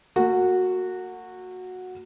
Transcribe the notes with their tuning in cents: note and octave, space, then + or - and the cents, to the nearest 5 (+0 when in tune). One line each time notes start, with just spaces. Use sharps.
A#3 -40 F#4 -10